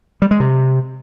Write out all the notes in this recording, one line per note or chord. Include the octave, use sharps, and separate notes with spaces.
G3
G#3
C3